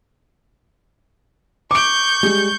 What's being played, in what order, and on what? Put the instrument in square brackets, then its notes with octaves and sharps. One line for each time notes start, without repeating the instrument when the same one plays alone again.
[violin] C#6 G6 [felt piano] D6 D7
[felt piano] G3 G#3